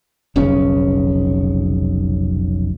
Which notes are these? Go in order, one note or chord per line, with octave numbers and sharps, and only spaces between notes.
F1 B1 C#3 C#4